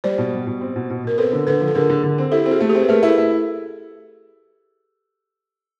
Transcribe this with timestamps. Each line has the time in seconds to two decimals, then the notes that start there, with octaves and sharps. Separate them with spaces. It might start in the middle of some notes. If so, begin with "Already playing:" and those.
0.04 G3 C5 D5
0.18 B2
0.33 G3
0.47 B2
0.61 C4
0.76 B2
0.90 B2
1.04 B2 A#4
1.18 C4 A4 B4
1.33 D3
1.47 D3 A4 B4
1.61 F3
1.68 A4
1.75 D3 G#4 A#4
1.90 D3
2.03 D3
2.18 C4
2.32 E4 G4 A4
2.46 C4
2.51 F#4 G#4
2.60 A3
2.69 G4 A4
2.75 C4
2.82 B4
2.89 A3 G#4 A#4
3.03 E4
3.08 A4 B4
3.18 E4